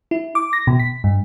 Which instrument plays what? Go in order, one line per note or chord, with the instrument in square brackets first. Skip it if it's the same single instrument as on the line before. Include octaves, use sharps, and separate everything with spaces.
[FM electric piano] E4
D6
A#6
B2
B6
G2